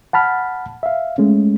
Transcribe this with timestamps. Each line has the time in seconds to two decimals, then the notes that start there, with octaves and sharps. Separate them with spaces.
0.13 F#5 A5 B5 F6
0.83 E5 F5
1.18 G#3 A3 C#4